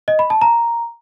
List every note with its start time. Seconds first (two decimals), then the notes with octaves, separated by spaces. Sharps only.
0.08 D#5
0.19 B5
0.30 A5
0.41 A#5